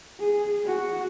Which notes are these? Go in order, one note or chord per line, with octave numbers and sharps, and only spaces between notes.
G#4
F#4